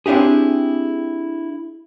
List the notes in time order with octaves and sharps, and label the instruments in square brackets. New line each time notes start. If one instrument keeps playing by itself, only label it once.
[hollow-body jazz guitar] C4 D4 E4 G4 G#4